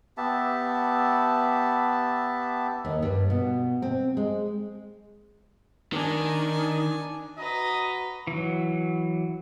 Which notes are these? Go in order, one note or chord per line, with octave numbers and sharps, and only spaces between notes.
B3 G4 E5 A5
D#2
G2
B2
C4
G#3
D#3 D4 G#5
F#4 B4 D#5 A#5
E3 F#3